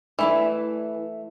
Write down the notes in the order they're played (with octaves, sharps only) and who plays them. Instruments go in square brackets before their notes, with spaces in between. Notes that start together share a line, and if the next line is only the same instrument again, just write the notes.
[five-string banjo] E3 [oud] A3 E4 D5